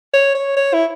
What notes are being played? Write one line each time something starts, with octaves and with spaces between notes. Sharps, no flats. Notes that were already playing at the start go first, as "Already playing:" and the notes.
C#5
C#5
C#5
E4